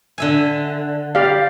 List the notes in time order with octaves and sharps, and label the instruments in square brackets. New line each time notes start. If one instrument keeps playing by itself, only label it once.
[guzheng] D3 E5 G#5
[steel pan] G4 D5 F5